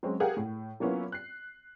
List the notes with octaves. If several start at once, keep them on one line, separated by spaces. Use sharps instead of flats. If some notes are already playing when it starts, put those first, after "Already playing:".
F#3 G#3 C4 C#4
G4 G#4 A#4 F5 F#5
A2
F#3 A#3 B3 C#4 E4 F4
F#6 C7